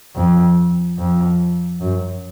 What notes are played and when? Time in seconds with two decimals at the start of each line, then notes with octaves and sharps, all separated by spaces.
0.16 F2
0.98 F2
1.81 F#2